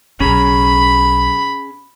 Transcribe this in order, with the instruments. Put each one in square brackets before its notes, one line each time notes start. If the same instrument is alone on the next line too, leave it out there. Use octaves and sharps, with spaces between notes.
[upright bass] B1 [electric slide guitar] C#4 G#4 A#5 [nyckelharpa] B5